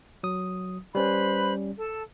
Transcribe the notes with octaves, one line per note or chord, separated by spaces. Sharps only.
F#3 D#6
G3 C#4 B4 C5 B5
A4 A5